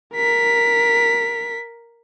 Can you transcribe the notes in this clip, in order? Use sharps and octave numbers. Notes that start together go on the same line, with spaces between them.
A#4 B6